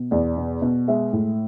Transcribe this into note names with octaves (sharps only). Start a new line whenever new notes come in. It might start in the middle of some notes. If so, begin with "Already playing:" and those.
Already playing: B2
E2 D5
B2
B2
G#3 E5
A2